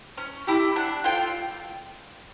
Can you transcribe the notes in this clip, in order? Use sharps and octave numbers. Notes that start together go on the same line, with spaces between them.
C#4
E4 G4
D4 F#5
F4 A4 G5